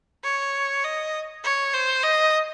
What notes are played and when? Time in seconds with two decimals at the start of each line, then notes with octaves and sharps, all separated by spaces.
0.24 C#5
0.84 D#5
1.44 C#5
1.74 C5
2.03 D#5